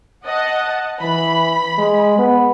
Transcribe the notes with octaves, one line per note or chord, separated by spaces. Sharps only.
D#5 F#5 A5
E3 B5
G#3
B3